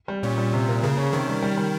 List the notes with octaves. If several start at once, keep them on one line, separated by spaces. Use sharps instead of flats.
G3
A#2 C#4
G3
C3
A#3
C#3 A#3
C#4
C3 D#3
G3
G3
G3